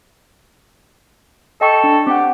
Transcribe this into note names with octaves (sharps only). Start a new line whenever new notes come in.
A4 D#5 G5 C#6
D4
C4 G4 F#5